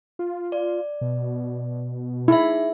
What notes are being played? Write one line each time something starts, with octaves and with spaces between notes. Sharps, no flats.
F4
D5
B2
D#4 E4 G#4 E5